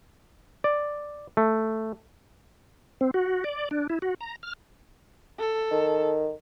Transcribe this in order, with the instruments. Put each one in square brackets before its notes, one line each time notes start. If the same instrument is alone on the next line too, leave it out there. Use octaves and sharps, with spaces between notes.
[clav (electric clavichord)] D5
A3
[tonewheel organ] C4
F#4
D5
D4
E4
F#4
A#5
F6
[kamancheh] A4
[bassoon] D#3